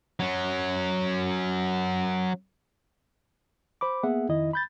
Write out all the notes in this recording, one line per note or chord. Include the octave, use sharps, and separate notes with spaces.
F#3 C#4
C5 B5 D6
A#3 B3 G#4 E5 F#5
F2 D#3 E4 D#5
B5 G6 A6